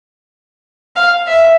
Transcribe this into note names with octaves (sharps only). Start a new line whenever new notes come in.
F5
E5